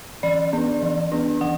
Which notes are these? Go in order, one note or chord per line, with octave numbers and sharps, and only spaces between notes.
E3 D5
B3 D4
E3
B3 D4
E3 F#5